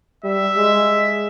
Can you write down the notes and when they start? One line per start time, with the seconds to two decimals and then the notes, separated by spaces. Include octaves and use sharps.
0.24 G3 E5
0.56 G#3